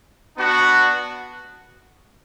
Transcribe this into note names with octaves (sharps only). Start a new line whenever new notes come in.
B3 D4 F#4